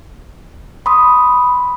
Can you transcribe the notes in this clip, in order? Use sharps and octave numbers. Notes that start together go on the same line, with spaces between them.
B5 C6 D#6